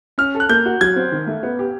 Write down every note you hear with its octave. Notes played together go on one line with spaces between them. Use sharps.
C#4 F6
A4
F#6
A#3 G6
F#4
F#3 G#6
C4
D#3
A3
B3
G4